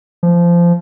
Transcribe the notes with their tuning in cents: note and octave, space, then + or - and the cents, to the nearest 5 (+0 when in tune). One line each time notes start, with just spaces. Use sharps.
F3 -20